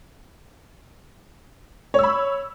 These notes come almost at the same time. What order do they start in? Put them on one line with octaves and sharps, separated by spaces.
C#5 E6 B5